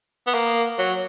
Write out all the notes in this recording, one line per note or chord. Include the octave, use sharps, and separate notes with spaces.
B3
A#3
F#3